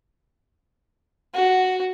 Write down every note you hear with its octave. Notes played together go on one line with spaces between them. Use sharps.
F#4